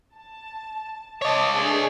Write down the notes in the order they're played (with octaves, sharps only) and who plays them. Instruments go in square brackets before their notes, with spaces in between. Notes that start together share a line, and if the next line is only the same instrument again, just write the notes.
[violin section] A5
[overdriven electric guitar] C#5 D#5 [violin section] A5 D6
[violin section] A3 D4 G#4